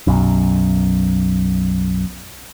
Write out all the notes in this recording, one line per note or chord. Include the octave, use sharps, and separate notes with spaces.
B1 F#2